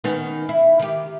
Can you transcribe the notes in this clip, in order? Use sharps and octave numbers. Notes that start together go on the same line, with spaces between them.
D#3 B3 C#4
E4
D#3 G4